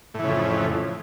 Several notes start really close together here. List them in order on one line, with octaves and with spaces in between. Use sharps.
A2 E3 C#3 F2